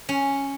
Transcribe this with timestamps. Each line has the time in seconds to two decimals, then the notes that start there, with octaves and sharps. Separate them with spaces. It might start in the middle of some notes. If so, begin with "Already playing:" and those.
0.09 C#4